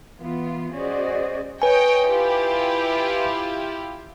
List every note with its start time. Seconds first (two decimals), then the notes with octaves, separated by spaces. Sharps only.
0.20 E3 B3 F4
0.73 C#4 F#4 G#4 C5 D5 D#5
1.62 B4 C#5 D#5 G5 G#5
2.09 E4 F4 G4